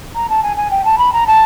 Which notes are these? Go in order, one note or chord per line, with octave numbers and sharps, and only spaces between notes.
A#5
A5
G#5
G#5
G5
A5
B5
A#5
A5